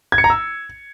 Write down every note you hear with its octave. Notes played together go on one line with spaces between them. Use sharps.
G#6
C#7
A#5
E6